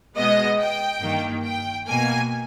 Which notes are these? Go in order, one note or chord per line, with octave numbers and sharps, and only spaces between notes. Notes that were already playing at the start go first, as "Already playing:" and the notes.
B2 G#3 B3 D#5
G5
G2 D#3 A#3
G5
B2 A#3 G#5